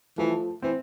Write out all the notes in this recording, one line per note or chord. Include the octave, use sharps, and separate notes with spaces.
E3 F3 A3
E3 C4